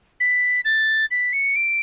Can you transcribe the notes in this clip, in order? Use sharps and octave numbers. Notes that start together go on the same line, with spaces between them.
B6
A6
B6
C#7
D7